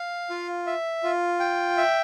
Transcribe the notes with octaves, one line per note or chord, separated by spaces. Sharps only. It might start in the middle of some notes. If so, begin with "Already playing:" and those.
Already playing: F5
F4
E5
F4
G5
E5